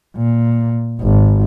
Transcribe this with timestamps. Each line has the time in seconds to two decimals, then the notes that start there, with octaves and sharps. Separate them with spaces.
0.16 A#2
1.01 G#1